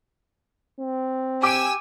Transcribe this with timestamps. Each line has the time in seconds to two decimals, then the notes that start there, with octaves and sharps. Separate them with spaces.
0.79 C4
1.43 G4 G#5 D6 E6 D7